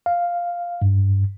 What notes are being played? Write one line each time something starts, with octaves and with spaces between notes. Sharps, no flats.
F5
G2